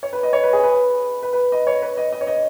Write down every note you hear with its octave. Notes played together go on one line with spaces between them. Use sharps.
C#5
B4
D#5
C#5
B4
G#4
B4
B4
B4
D#5
C#5
B4
D#5
D#5
C#5
D#5